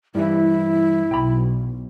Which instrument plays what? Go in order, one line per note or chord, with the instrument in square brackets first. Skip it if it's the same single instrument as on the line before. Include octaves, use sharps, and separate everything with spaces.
[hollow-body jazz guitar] G2 E3 [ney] E4
[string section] B1 [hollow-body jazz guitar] G5 B5